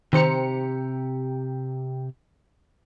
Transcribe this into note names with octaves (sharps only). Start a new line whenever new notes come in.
C3 D#3 G4 C5 A#5 C#7